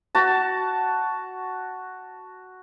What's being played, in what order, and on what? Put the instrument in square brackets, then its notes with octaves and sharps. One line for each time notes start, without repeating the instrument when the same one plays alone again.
[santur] F#4 A5